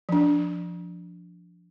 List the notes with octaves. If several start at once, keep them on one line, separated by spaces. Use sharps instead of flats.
F3 D4